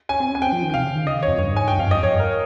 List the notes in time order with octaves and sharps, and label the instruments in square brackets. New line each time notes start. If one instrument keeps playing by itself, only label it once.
[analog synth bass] C#4 [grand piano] G#5
[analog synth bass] C4
[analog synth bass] C#4 [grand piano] G#5
[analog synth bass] C4 [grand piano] G5
[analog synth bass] F3
D#3
[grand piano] G5
[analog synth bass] C3 [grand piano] F5
[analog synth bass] C#3
D#3
[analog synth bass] C#3 [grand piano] D#5
[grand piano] C#5
[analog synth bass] F2
[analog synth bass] G2 [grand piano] C#5
[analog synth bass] G#2 [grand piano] G#5
[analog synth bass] G2 [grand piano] G5
[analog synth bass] F2 [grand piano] F5
[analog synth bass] G2
[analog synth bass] F2 [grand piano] D#5
[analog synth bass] F2 [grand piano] C#5
[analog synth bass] G2
[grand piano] A#4